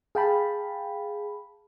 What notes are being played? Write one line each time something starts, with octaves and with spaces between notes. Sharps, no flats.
G#4 F5 G5 A5 B5